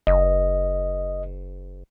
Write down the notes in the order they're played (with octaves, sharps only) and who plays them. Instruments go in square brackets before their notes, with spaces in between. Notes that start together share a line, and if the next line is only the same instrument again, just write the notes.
[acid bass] F#1 [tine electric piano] D#5